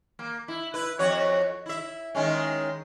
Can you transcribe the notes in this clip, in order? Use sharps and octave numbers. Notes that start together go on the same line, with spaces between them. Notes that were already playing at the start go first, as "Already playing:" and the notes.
A#3
E4
E4 B4
F2 F#4 C#5
E4 E5
D#3 G#3 C#4